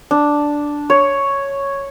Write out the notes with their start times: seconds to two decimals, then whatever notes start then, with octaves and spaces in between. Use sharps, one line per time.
0.11 D4
0.90 C#5